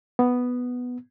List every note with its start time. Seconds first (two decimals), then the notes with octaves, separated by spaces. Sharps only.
0.19 B3